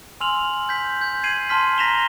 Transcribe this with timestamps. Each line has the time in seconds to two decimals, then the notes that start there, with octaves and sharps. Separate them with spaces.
0.20 G#5 C6 E6 F6 F7 F#7
0.69 G6 B6
1.01 G6
1.23 G#6 C7 D#7 F#7
1.49 A5 C6 F6 B6
1.78 A#5 A#6 B6 E7 F7 G7